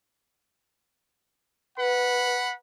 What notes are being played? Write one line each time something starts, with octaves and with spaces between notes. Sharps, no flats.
B4 F#5 B5